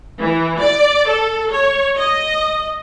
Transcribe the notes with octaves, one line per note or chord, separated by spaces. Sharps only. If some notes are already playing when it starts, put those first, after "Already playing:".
E3
D5
A4
C#5
D#5